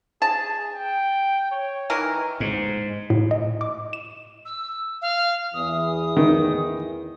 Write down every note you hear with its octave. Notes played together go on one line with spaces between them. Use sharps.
G#4 A5
G5
C#5
D#3 E3 A#4
G#2
A2
D#5
D6
E7
E6
F5
E2 E3 D#6
D#3